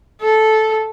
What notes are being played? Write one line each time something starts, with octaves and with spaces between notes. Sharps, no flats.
A4